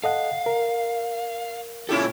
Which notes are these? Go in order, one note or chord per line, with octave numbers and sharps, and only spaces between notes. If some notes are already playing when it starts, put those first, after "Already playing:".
A4 D#5 F5 F#5
A#4
A#2 C#4 E4 F4 G4 A4